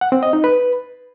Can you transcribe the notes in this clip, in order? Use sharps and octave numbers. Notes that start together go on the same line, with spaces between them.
F#5
C4
D#5
D#4
B4